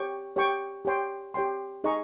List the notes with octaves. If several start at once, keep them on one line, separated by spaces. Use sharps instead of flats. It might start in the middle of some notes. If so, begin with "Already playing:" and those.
Already playing: G4 C#5 G5 C#6
G4 C#5 G5 C#6
G4 C#5 G5 C6
G4 C#5 G5 C6
D#4 G#4 D#5 A#5 C#6